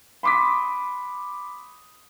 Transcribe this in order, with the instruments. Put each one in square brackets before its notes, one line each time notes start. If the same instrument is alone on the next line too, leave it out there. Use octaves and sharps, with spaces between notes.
[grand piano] B5 C6 D6 D#6 B6